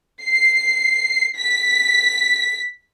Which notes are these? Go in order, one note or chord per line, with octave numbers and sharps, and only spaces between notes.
C7
B6